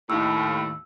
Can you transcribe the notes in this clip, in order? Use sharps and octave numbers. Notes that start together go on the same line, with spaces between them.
D#2 A2 E6